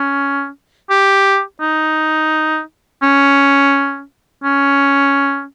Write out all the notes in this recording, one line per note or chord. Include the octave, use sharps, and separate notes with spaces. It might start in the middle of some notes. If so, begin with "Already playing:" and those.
Already playing: C#4
G4
D#4
C#4
C#4